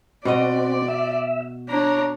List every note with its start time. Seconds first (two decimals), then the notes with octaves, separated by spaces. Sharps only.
0.25 B2 C4 F#4 D5 D#5
0.88 E5
1.69 D4 C#5 A#5